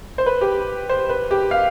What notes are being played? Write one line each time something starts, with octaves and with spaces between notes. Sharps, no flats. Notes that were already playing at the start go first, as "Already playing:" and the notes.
C5
B4
G4
C5
B4
G4
F5